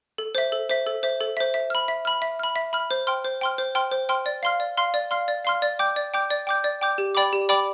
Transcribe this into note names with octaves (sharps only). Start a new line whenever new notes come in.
A4
C5 E5
A4
C5 E5
A4
C5 E5
A4
C5 E5
E5
B5 F6
E5
B5 F6
E5
B5 F6
E5
B5 F6
C5
G5 C6 F6
C5
G5 C6 F6
C5
G5 C6 F6
C5
G5 C6 F6
D5
F5 C6 F6
D5
F5 C6 F6
D5
F5 C6 F6
D5
F5 C6 F6
D5
G5 D6 G6
D5
G5 D6 G6
D5
G5 D6 G6
D5
G5 D6 G6
G4
D5 G5 B5 D6
G4
D5 G5 B5 D6